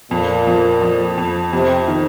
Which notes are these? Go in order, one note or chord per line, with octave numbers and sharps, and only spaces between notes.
F2 A#2
F2
F3
F2
F2 C3
D#3